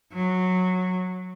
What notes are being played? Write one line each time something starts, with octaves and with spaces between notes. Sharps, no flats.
F#3